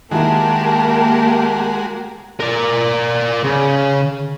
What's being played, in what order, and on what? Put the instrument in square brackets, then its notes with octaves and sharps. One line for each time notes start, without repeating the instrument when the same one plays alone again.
[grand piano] D#3 E4 [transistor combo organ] G#3 F#4 [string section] A#3 G4 A#4 [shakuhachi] A5
[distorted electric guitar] A#4 D5
C#3